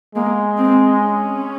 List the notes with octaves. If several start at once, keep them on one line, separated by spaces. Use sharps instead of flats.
G#3 A#3
C4
C#4